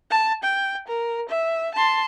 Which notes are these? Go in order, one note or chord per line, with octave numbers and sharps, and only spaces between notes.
A5
G5
A#4
E5
A5 C6